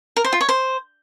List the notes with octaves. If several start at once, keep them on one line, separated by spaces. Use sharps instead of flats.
A#4
C5
F4
C#5
C5